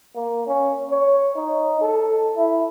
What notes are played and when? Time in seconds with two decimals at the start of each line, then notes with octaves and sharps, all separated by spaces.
0.15 A#3
0.47 C#4
0.90 C#5
1.35 D#4
1.81 A4
2.36 E4